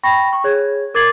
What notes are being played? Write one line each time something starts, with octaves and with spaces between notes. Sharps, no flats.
G5 B5 C#6 A#6
C#6
G#4 C#5 G#6
A#4 D6 G#6 A6 C7 F#7